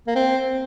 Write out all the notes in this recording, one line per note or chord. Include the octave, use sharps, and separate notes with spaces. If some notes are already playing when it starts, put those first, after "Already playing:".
A#3
C4